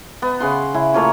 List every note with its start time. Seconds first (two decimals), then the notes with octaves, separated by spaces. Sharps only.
0.22 B3
0.40 C#3 F#5 C6
0.74 C#3 E4
0.94 A3 A#3 F4 C#5